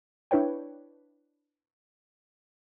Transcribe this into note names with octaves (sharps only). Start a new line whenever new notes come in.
D4 E4 B4 C#5 G5